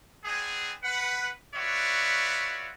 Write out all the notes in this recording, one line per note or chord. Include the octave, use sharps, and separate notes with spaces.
B3 C4 D4 G#4
B4 F#5
F4 F#4 B4 C#5 D5 E5